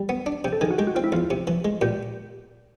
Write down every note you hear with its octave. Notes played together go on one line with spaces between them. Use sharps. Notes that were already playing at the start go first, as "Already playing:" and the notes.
Already playing: G3
B3
D4
C3 G4
A4
D#3 G#4
F#4
G#3 G4
F#4
C4 F4
E4
E2 F4
C3
E3
G#3
A#2 G4